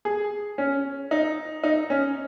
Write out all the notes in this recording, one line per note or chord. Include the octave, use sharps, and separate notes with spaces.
G#4
C#4
D#4
D#4
C#4